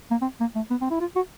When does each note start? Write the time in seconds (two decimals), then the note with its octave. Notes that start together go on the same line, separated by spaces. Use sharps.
0.11 A#3
0.22 C4
0.40 A#3
0.56 A3
0.71 B3
0.81 C4
0.91 E4
1.00 F4
1.16 F#4